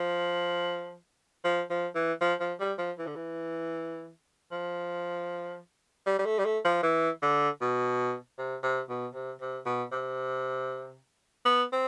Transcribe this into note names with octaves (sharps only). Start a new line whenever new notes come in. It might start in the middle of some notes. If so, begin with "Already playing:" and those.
Already playing: F3
F3
F3
E3
F3
F3
G3
F3
E3
D3
E3
F3
G3
G3
A3
G3
A3
F3
E3
D3
B2
C3
C3
B2
C3
C3
B2
C3
B3
C4